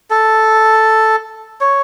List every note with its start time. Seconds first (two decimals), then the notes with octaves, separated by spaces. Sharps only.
0.10 A4
1.61 C#5